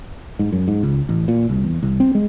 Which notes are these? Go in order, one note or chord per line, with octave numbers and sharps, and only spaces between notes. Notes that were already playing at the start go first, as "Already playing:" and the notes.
G#2
F#2
G#2
C#2
A1
A#2
C2
E2
C2
C4
G#3